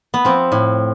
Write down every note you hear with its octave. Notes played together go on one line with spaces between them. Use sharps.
B3
F3 C4
A2